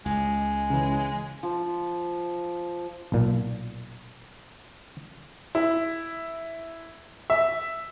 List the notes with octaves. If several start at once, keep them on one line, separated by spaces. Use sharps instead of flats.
C#2 G#3
C#3 E3
F3
B1 A#2
E4
E5